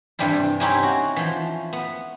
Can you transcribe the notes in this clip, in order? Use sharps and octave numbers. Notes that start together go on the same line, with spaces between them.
G2 C3 E3 G3 E4
C4 C#4 D#4 E4 G4 G#5
F#4
E3 F3
B3